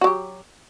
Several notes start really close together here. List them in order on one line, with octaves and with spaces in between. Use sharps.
F#4 F#3 G4